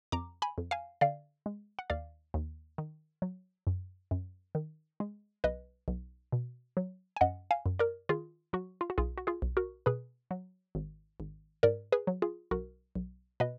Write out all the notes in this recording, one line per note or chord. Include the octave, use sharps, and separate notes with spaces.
F2 A#5 D6
G#5 B5
F2
F5 G#5
D3 D5 F5
G#3
F#5
D#2 D5 F5
D#2
D#3
F#3
F#2
F#2
D#3
G#3
B1 B4 D#5
B1
B2
F#3
G#5
F#2 D#5 F#5
F5 G#5
F#2
A#4 D5
D#3 F4 G#4
F#3 F#4
F4
F#4
B1 F4 G#4
F#4
F4 G#4
B1
F#4 A#4
B2 G#4 B4
F#3
G#1
G#1
G#2 A#4 D5
G#4 B4
F#3
F4 G#4
B1 F#4 A#4
B1
B2 B4 D#5